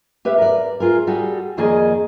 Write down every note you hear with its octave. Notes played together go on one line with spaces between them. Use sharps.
G4 B4 E5 F5
A#4 D5
F4 G#4 A#4
G3 F#4 G#4 A4
F2 D#3 A#3 G#4 D5 D#5